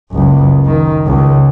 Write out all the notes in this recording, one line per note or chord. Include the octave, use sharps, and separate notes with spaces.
F#1 C#2
D#3
C#2